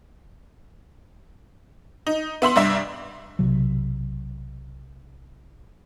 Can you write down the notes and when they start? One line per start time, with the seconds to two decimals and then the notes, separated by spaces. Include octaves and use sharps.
2.07 D#4
2.42 B3 E5 C6 F#7
2.56 C2 G2 E5
3.39 B1 C3 F#3